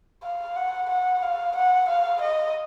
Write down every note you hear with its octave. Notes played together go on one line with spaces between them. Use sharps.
F5
F#5
F#5
F5
F#5
F5
D#5